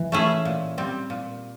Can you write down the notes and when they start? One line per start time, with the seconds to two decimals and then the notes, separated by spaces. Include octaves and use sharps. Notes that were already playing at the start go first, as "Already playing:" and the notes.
Already playing: E3
0.12 A3 C#4 E4 G#4
0.45 A#2
0.78 G3 C4
1.10 A#2